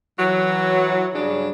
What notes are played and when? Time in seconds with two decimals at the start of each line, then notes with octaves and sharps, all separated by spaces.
0.19 E3 F#3
1.15 G2 C#3 F#3 D4